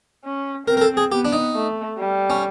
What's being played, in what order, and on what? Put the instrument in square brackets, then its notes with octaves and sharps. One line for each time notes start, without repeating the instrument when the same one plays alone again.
[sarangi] C#4
[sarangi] C4 [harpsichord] A#4
[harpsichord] A#4
A4
G#4
[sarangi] B3 [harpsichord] G4
[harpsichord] D4
D#4
[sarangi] A3
G3
[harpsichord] C#4